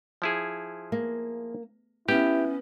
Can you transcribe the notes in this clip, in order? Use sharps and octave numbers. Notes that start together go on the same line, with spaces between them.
F3 E4 G#4
A#3
B3 C#4 E4 G4